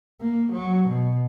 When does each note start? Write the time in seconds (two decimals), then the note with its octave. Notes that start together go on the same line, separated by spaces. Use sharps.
0.21 A#3
0.52 F#3
0.88 B2